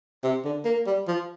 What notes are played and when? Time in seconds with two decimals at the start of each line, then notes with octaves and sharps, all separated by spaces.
0.24 C3
0.45 D3
0.65 A#3
0.86 G3
1.07 F3